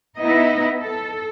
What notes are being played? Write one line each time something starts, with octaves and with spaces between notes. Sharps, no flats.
B3 D#4 E4 D#5
A4